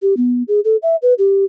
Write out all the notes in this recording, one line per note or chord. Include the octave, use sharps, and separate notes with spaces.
G4
B3
G#4
A4
E5
B4
G4